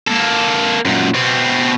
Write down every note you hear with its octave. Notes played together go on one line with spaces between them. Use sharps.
A#3 A4
F#2 A#2
B2 C4